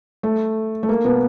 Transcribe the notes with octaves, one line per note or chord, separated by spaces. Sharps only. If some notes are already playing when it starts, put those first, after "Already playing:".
A3
A3
A#3
B2 B3